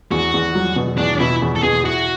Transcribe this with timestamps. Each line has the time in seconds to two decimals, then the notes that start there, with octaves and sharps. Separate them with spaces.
0.11 E2 F#4
0.34 E2
0.55 F#3
0.76 B2
0.98 E2 D4
1.20 B2 E4
1.42 E2
1.56 A4
1.63 B2 G#4
1.85 E4 F#4